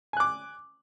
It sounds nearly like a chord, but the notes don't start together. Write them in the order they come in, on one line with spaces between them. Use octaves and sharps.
G#5 F#6 D6